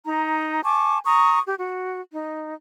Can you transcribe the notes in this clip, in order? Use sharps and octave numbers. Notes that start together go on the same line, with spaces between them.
D#4 A#5
G#5 A5 C#6 D6
A#5 C#6 D#6
G4
F#4
D#4